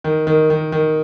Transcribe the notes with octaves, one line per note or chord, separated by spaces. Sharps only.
D#3
D#3
D#3
D#3